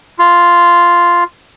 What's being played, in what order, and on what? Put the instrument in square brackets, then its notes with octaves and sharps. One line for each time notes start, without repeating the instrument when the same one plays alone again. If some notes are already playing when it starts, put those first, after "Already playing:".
[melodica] F4